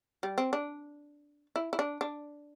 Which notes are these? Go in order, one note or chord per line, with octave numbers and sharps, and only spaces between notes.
G3
C4
D4
E4
E4
D4
D4